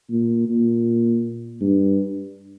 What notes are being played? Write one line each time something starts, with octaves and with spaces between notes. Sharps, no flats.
A#2
A#2
G2